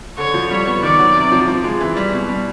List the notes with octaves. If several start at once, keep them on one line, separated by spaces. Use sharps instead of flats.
D3 C#5
F3
G3
B3
D#3 D5
F#3
C3
F3
F3
G#3
E3
G3
B2
G3